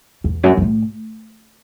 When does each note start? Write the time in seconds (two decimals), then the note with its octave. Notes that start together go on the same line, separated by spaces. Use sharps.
0.24 E2
0.43 F#2
0.57 F#2
0.62 A2